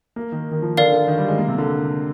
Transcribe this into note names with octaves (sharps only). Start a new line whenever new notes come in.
A#3
D#3
D#3
F3
D3 A#4 D5 F5
D3
D#3
G3
G#3
A#3
C3
D3